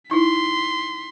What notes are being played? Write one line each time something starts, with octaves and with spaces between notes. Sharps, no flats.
D#4 E4 C6 B6